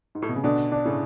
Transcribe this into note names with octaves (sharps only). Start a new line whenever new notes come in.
G#2
A2
B2
C#3
B2 D3 D4
D4
A2 C#3